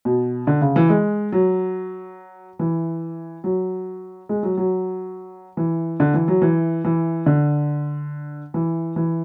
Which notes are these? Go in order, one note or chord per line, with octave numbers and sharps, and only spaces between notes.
B2
D3
C#3
E3
G#3
F#3
E3
F#3
G#3
F#3
F#3
E3
D3
E3
F#3
E3
E3
D3
E3
E3